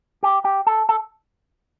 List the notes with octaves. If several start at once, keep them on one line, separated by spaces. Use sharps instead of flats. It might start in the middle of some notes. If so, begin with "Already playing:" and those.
G4
G4
A4
A4